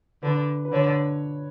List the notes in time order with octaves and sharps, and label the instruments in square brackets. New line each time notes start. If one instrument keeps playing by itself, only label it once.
[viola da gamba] D3 [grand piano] B4
[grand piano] B4
[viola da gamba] D3 [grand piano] C#5